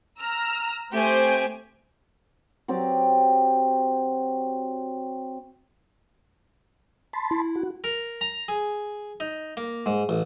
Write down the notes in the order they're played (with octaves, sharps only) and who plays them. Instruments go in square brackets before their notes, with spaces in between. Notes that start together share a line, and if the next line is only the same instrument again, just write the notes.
[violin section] A#5 E6 F6
[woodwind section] A3 [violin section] C4 G#5 [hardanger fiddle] G4 C5
[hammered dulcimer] F#3 C4 G4 D5
[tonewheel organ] A5 B5 C6
[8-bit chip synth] E4
[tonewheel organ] F#4
[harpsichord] A#4
A#5
G#4
D#4
A#3
G#2
A1